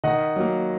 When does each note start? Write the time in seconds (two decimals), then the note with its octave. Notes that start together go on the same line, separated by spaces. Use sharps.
0.04 D#3 D#5 F#5
0.36 F#3 A#3